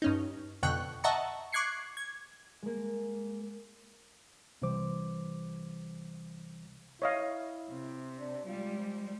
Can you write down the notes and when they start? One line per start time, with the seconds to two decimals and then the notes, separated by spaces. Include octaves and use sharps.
0.02 G2 C#4 D#4
0.63 F2 B2 D3 G5 C#6 F#6
1.04 D#5 E5 F#5 A5 A#5 C#6
1.52 C#6 D6 F#6 G#6 C7 C#7
1.97 G#6
2.63 G#3 A#3
4.62 C2 C3 E3 G3 C5 D6
7.02 E4 C#5 D#5 F5
7.70 C3
8.18 D4
8.46 G3 G#3 F4
8.77 F3